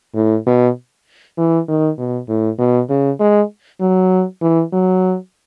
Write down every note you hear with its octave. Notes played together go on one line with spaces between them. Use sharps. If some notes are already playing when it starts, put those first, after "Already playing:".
A2
B2
E3
D#3
B2
A2
B2
C#3
G#3
F#3
E3
F#3